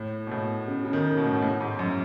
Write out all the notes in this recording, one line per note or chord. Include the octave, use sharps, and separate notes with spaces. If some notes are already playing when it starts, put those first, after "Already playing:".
Already playing: A2
B2
A2
C#3
C#3
D#3
B2
A2
B2
A2
G#2
F#2